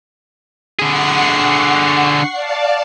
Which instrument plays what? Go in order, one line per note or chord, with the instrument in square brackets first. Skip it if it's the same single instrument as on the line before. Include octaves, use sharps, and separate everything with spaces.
[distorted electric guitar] D3 G#4 [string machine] F#5 C#6 C7
[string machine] D5 F5 A5